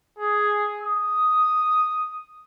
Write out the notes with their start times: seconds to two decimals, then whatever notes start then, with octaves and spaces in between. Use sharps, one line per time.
0.19 G#4
0.81 D#6